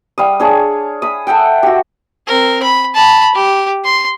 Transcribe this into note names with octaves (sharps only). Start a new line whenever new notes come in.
G3 F5 D#6
D4 G#4 C#5
B5 D#6
A4 E5 F#5 G5
F#4 G4
C4 A#4
B5
A5 B5
G4
C6